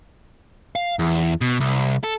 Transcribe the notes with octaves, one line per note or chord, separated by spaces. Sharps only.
F5
E2
B2
C2
A4